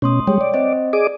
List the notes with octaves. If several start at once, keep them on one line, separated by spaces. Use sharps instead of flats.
B2 A3 C#4 C6 D#6
G3 G#3 C#5 G5
D5
C4 C5 D#5
G#4 D5 D#5 D6